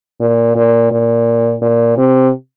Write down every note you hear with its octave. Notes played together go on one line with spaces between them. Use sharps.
A#2
A#2
A#2
A#2
C3